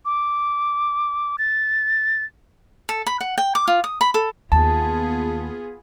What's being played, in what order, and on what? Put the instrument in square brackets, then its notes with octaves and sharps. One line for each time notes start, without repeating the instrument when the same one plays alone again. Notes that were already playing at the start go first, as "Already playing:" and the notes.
[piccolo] D6
A6
[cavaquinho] A4
B5
F#5
G5
D6
F4
D#6
B5
A4
[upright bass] D#2 [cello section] B3 F4 G#4 [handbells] A5